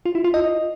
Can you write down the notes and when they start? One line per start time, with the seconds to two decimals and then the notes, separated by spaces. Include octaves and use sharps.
0.05 F4
0.15 E4
0.24 F4
0.34 D#5